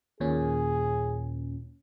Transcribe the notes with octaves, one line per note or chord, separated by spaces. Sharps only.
D#2 A#2 C#4 G#4